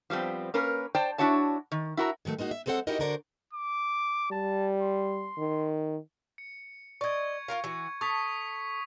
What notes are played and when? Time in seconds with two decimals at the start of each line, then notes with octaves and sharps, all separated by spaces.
0.10 F3 G3 B3 C4
0.54 A#3 C#4 A#4 B4
0.95 C5 D5 G5 A5
1.18 D4 E4 F#4 C#5 A5
1.72 D#3
1.97 E4 F#4 A#4 A#5
2.25 D3 D#3 F#3 A3
2.38 G#3 A#3 D#4 F#4
2.51 E5
2.66 F#3 G#3 C4 A4 C5 F#5
2.87 D#4 E4 F#4 G4 A#4 D#5
2.99 D3 F#4 A#4 C5 D5
3.53 D6
4.32 G3 A5
4.82 C6
5.38 D#3
6.38 C#7
7.01 D5 D#5 C#6 G#6
7.48 F4 A#4 F5
7.64 E3 F#4
8.01 A4 C#6 D#6 B6